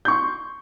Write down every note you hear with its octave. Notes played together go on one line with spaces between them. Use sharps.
C6 C#6 G6